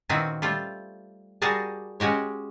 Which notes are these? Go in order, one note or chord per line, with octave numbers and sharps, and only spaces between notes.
A#2 D#3 C4 E4 F#4 B4
G3 A3 F4
G3 F#4 G#4 A#4 A5
G#3 C#4 F#4 G4 C#5